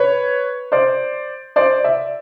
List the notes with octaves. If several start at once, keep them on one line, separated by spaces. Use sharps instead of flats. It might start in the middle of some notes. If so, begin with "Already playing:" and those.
Already playing: B4 C#5
C5 D5
C5 D5
D5 E5